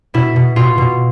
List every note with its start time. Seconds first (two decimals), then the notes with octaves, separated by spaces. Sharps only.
0.14 B2 E4
0.36 B2
0.56 B2 F4
0.78 B2